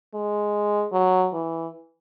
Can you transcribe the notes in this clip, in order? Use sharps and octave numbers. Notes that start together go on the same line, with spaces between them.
G#3
F#3
E3